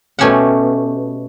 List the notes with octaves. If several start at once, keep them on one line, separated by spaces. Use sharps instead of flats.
B2 A3 C#4 G4 E5 F#5